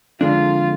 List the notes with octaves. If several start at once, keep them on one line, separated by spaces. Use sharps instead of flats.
F2 D3 G#3 D4 F4